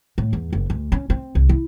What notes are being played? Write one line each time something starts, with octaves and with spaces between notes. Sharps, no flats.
A2
E2
F#1
D2
C#4
C4
C2
E4